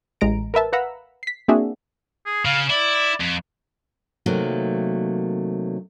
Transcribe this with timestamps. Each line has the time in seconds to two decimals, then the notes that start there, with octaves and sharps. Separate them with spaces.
0.21 A1 G#3 A#5 D7
0.54 A#4 B4 E5 A5
0.73 B4 F5 F#5 A#5 B5 E6
1.23 B6 C7
1.48 A#3 C4 D4 F#4 G#4 E5
2.26 G#4
2.45 C#3 F5
2.70 E4 D5
3.21 F2
4.26 C3 D#3 F#3 A3 A#3